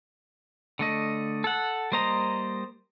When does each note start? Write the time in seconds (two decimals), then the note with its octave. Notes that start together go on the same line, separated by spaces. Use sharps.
0.79 D3 A3 D#5
1.44 A4 F#5
1.92 G3 A#3 C5 D#5 A#5